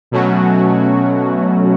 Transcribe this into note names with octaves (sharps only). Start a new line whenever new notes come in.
B2 F#3 A3 C#4 F#4